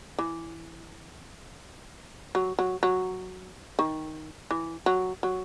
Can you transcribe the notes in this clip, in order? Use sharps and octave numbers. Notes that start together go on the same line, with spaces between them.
E3
F#3
F#3
F#3
D#3
E3
F#3
F#3